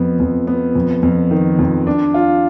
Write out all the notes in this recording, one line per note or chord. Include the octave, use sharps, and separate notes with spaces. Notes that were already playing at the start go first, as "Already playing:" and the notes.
Already playing: F2 B3
F2
B3
F2
F2
D#3
F2
D4
F4